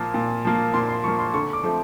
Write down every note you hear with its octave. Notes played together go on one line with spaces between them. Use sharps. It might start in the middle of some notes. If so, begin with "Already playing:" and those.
Already playing: A#2 F3 A#3
A#2
F3 A#3
A#2 C6
C6
F3 A#3 C#6
C6
D3 C#6
D6
F3 A3 C4